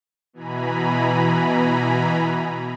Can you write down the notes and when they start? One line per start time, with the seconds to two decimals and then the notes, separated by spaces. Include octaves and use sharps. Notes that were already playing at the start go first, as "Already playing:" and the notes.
0.33 B2 E3 G#5 A#5 B5